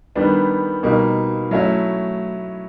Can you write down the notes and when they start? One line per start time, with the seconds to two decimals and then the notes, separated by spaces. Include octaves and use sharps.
0.16 D#3 G3 B3 D4
0.83 B2 G3 A#3 D#4
1.51 F#3 A3 C#4 E4